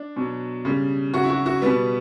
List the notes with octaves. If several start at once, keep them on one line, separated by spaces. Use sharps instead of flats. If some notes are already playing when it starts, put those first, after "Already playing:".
Already playing: D4
B2 F#3
C#3 G3
C#3 F#3 F#4
E4
F#4
F#4
B2 G3 B3